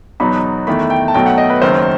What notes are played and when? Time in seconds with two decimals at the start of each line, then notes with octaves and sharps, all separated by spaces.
0.20 E2 B2 F#3 B3 D#4 B5
0.67 E2 D#3 A3 E4 B5
0.90 G5
1.08 A5
1.14 B1 B2 F#3 A3 G5
1.26 F#5
1.38 D#5
1.50 B4
1.62 F#1 F#2 D#3 C5